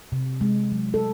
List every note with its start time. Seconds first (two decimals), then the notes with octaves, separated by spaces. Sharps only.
0.12 C3
0.41 G#3
0.72 F#3
0.94 A4